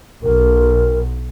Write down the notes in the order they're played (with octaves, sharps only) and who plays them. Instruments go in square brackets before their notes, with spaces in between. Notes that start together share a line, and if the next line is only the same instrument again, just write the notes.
[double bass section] B1 [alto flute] A#4